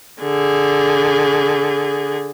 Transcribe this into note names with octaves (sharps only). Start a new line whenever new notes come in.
D3 G#4